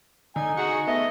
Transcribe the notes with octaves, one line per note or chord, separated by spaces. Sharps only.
D3 D#4 G#5
F#4 G#4 F#5 C#6
A3 B3 D#5